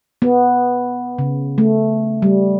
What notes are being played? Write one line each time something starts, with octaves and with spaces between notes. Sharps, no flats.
B3
C#3
A3
G3